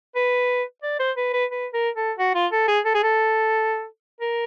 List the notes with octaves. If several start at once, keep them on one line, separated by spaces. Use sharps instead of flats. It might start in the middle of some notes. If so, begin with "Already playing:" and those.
B4
D5
C5
B4
B4
B4
A#4
A4
F#4
F4
A4
G#4
A4
G#4
A4
A#4